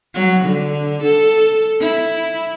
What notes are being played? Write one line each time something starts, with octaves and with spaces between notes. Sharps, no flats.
F#3
D3
A4
E4